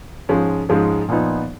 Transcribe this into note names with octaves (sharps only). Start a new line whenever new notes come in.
G#2 F3 G#3 C#4
G#2 F3 G#3 C#4
A#2 F3 B3 D#4